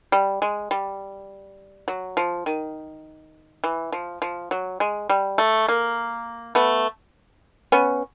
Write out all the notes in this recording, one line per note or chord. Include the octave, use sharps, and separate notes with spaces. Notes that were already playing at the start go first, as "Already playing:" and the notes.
G3
G#3
G3
F#3
F3
D#3
E3
F3
F3
F#3
G#3
G3
A3
A#3
A3 B3
B3 C#4